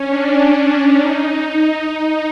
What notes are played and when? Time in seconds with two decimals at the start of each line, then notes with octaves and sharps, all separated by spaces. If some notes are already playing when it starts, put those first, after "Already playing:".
Already playing: C#4
0.08 D4
0.98 D#4
1.28 D#4